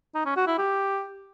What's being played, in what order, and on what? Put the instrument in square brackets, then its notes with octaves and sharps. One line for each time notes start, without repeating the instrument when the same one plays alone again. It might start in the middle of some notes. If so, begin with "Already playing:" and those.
[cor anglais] D#4
C#4
F#4
E4
G4